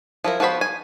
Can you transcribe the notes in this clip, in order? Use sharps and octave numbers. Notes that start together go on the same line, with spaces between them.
F3 E4 A#4
F3 B3 F#4 C5 B5
G#5